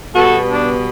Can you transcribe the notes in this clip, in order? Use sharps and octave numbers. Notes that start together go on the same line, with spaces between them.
B2 G3 B3 F#4 A4
D4